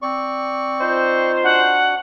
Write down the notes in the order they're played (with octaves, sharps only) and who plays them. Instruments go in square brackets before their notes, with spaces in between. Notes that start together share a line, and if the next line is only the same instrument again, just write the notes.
[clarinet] C4 [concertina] D5 C#6
[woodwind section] D#4 F4 C5
[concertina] D4 F#4 [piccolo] F#5